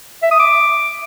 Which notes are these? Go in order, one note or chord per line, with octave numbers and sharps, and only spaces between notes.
E5
D#6
D6